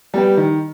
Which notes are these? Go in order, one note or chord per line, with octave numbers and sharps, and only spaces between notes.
G3 B3 G4
D#3